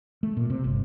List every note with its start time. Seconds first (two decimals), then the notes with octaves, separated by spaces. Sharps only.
0.23 A3
0.37 A#2
0.50 C3
0.64 G1